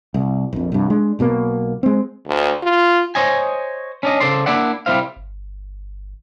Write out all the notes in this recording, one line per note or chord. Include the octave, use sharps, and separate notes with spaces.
C2
A#1 F2
C2 G2
G#3 D4
B1 B2 F3 A#3
G#3 C4
D2
F4
C5 C#5 D#5 G#5
C#4 D4 D#5
C#3 G3 A4 C5 D5 C6
A#3 D4 E4 D5 F#5
C2 G3 G#3 E4 C5 F5
G1